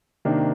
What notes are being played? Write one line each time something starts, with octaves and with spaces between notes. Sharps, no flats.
C3 D#3 A#3 D4